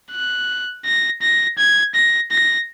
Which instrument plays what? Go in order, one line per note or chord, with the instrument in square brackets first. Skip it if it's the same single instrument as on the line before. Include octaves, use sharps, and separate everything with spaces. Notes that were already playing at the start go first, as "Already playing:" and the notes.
[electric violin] F#6
A#6
A#6
G#6
A#6
A#6